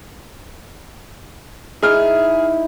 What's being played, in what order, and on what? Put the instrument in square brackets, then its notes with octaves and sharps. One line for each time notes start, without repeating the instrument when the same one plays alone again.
[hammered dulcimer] D#4 E4 E5 [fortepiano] G#4 F6